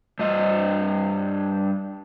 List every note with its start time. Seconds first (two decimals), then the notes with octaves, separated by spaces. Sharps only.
0.19 G2 D#5